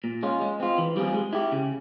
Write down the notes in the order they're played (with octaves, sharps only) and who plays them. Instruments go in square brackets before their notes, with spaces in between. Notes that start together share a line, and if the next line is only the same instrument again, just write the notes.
[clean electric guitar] A#2
G#3 C#4 F4
G#3
C4 F4
E3
G3 C4 F4 G#4
G#3
E4 G4
C#3